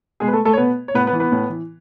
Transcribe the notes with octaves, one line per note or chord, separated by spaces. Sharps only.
B2 G#3 G#4
B4
A3 A4
A3 A4
C#5
B2 B3 B4
C#5
A2 B3 B4
B3 B4
E3
B3 B4
A2
E3